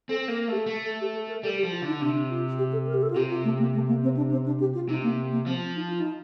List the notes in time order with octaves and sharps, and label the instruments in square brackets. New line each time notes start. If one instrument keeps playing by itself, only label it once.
[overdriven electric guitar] C4 [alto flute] A4
[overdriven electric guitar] A#3 [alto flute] A#4
[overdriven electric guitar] A3 [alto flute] G4
[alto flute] A4
[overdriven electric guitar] A3
[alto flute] A4
G4
A4
A#4
[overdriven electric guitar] G3 [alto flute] A4
[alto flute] G4
[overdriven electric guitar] F3
[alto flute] F4
[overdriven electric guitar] D3
[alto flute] D#4
[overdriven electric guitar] C3 [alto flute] D4
[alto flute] F4
G4
A4
A#4
G4
A4
F4
[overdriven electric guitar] C3 [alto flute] G4
[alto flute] F4
A3
A#3
A3
A#3
C4
D4
C4
D4
G4
F4
[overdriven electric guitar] C3 [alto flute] D#4
[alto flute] A#3
A#3
[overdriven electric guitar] F3 [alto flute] C4
[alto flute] D#4
F4
D#4